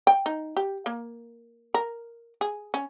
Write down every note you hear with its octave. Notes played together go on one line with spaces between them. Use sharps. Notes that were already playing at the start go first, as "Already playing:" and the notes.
G5
D#4
G4
A#3
A#4
G#4
C#4